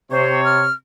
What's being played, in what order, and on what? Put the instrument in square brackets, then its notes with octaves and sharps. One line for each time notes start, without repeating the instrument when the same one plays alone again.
[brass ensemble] C3 C#5 [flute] C5
[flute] F6